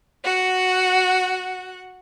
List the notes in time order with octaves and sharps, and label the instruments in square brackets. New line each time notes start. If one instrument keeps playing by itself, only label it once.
[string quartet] F#4 F#5